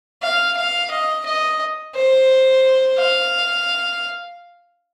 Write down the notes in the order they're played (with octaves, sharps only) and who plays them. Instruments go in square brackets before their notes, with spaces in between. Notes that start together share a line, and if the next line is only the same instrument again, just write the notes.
[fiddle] F5
F5
D#5
D#5
C5
F5